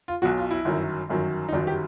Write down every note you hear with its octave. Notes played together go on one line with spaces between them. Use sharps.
F4
B1 B2 F#3 F#4
F4
E4
G1 F#2 D#3 F#3
G1 F#2 D#3 F#3
D#4
G1 F#2 D#3 F#3 D4
G4